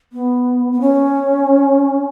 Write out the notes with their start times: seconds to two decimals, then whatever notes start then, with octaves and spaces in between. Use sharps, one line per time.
0.13 B3
0.72 B3
0.81 C#4